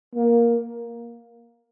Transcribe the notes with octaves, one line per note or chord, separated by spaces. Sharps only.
A#3